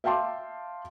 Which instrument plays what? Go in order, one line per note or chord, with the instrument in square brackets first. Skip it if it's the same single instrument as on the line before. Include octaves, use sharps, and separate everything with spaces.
[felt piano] E5 F5 G5 A5 C6 D6